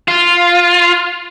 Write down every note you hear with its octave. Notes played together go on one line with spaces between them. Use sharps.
F4